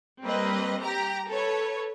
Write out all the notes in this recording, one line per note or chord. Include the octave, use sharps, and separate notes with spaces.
G3 A#3 C4 B4 D#5
G4 A#5
A4 B4 C#5